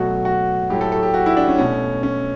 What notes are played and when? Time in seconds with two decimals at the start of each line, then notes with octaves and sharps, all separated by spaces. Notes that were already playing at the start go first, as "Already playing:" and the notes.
Already playing: B2 F#3 A3 F#4
0.25 F#4
0.70 A2 F#3 A3 G4
0.81 A4
0.92 A4
1.03 G4
1.14 F#4
1.26 E4
1.37 D4
1.48 C#4
1.58 B2 A3 C#4
2.03 C#4